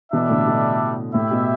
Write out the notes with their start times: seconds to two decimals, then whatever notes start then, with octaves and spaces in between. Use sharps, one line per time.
0.12 B2 E3 G3 D4 A4 E5
0.29 A2 D3
0.47 B2
1.14 A2 E4 G4 E5
1.31 B2